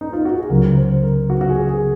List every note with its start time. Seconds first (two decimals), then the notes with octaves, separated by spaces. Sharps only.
0.01 D#4
0.13 F4
0.25 F#4
0.38 G#4
0.50 C#2 C#3 F#3 A#4
0.76 C5
1.03 A#4
1.30 F#4
1.41 F#4
1.49 G#4
1.69 G#4